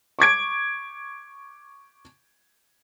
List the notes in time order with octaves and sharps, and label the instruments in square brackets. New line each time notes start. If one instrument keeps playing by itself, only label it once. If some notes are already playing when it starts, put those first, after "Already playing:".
[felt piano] C#6 D6 G#6 D7